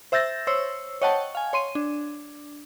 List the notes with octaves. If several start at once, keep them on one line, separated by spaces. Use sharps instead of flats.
C5 E5 E6 G6 A6 A#6
C5 C#5 E6
C#5 D#5 F#5 G5 A5 C#6
F5 G#5
C#5 C6 D#7
D4